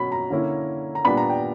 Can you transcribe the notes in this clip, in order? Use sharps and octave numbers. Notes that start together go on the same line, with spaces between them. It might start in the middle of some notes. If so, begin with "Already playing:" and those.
Already playing: B2 F#3 C#4 B5
A#5
D3 A#3 C#4 E4
A#5
A#2 G3 B3 D4 B5
A#5
G5